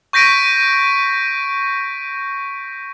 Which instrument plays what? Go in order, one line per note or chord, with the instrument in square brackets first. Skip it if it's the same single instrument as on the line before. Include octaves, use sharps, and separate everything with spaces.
[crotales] C#6 G6 A#6 B6 D7 D#7